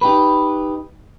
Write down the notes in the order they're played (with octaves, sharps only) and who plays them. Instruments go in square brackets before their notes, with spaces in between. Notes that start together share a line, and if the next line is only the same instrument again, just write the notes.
[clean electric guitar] D#4 G4 B4